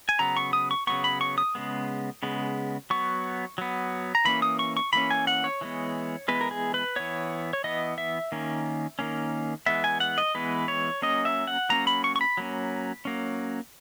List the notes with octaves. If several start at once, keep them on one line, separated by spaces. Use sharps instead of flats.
G#5
C#3 F#3 B3 A#5
C#6
D#6
C#6
C#3 F#3 B3 C#6
B5
C#6
D#6
C#3 G#3 B3
C#3 G#3 B3
F#3 B3 C#6
F#3 B3
A#5
E3 A#3 C#4 B5
D#6
C#6
C#6
E3 A#3 C#4 B5
G#5
F#5
C#5
E3 G#3 B3
E3 G#3 B3 B4
A#4
G#4
B4
E3 B3 C#5
C#5
E3 B3 D#5
E5
D#3 A#3 C#4
D#3 A#3 C#4
E3 G#3 B3 E5
G#5
F#5
D#5
E3 G#3 B3 B4
C#5
F#3 A#3 C#4 D#5
E5
F#5
F#3 A#3 C#4 A#5
B5
C#6
C#6
B5
F#3 A#3 C#4
F#3 A#3 C#4